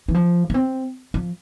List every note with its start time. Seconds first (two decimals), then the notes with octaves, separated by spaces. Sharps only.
0.08 E3
0.14 F3
0.50 A#3
0.54 C4
1.14 F3